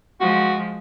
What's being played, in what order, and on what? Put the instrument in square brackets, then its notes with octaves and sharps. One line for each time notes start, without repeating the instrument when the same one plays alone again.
[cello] F3 G#3 [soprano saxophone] F#4